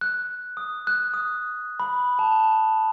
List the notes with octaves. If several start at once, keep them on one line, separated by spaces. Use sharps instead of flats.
F#6
D#6
F#6
D#6
B5
A5